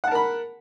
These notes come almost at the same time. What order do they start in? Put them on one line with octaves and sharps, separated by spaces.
F#5 A5 A#4 B5